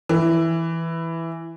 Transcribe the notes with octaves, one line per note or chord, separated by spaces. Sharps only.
E3